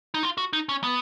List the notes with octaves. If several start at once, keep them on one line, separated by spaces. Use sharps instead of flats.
D#4
F4
F#4
D#4
C#4
B3